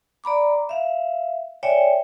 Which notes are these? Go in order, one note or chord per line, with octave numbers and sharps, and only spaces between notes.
D5 A#5 B5 D6
E5 F5
C#5 D5 E5 G5 G#5